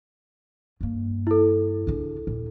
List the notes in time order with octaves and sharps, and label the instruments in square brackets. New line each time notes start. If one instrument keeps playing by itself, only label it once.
[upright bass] G2 A#3
[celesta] E4 A4
[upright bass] C#3 D4
D#2 A#2